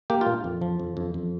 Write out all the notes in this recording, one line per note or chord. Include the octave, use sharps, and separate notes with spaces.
A#3 G4
F4
A#2
F2
F3
F2
F2
F2